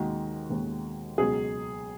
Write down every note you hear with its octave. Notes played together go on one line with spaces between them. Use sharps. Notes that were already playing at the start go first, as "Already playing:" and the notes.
Already playing: D#2 D#3 G#3 F#4
D#2 D#3 G#3
C#2 B2 F#3 G#4